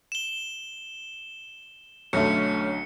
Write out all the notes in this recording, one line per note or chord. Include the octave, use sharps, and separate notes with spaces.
E7 G7
B1 D3 A3 C#4 C#7